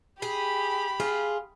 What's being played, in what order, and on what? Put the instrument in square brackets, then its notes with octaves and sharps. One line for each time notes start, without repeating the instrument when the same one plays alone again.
[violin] G4 B5 [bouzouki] G#4
[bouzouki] F4 [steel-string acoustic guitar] G#4